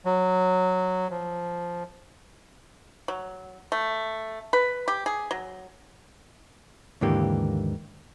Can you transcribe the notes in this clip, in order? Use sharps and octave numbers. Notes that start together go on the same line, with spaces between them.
F#3
F3
F#3
A3
B4
G4
G#4
F#3
D#2 G#2 D3 E3 A#3 G4